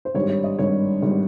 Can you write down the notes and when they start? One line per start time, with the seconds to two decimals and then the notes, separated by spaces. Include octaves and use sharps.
0.05 C5
0.15 G#1 G2 G3 C#5
0.29 C#5
0.44 D#5
0.58 G#1 G2 G3 C#5
1.02 G#1 G3